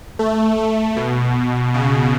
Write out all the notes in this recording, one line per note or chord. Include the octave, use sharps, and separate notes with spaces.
A3
A3
B2
C#3